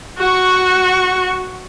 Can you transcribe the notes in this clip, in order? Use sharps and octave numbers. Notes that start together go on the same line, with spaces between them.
F#4 C#6